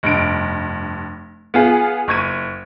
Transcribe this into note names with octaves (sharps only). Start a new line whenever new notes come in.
F1 G2 D7
B3 F4 G#4
F#1 C#6 G#6 D#7